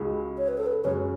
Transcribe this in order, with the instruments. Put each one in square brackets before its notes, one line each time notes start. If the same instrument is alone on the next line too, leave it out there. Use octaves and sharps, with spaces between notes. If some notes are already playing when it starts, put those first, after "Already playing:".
Already playing: [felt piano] C#2 C#3 G#3 D#4 F#4
[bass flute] C#5
B4
A4
B4
[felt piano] F#2 C#3 G#3 C#4 F#4 [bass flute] C#5